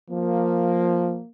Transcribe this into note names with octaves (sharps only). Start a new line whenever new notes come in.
F3 A#3